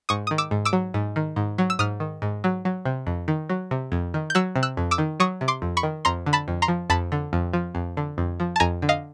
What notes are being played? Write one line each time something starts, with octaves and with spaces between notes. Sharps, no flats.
G#2 C#6 D#6
D#3 D#6
D6 E6
G#2
D6 E6
F#3
G#2
D#3
G#2
F#3
E6
G#2 D#6 F6
D#3
G#2
F#3
F#3
C3
F2
D#3
F#3
C3
F2
D#3
G6
F#3 E6 F#6
C3
E6 F#6
F2
D6 E6
D#3
F#3 C#6 D#6
C3
C6 D6
F2
B5 C#6
D#3
F2 A#5 C6
D3
A5 B5
F2
A#5 C6
F3
F2 A5 B5
D3
F2
F3
F2
D3
F2
F3
A5
F2 G#5 A#5
D3
D#5 F5